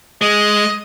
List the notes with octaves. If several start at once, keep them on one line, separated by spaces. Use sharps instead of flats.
G#3 D#5